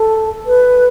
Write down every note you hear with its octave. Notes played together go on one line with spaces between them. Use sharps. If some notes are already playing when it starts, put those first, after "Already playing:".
Already playing: A4
B4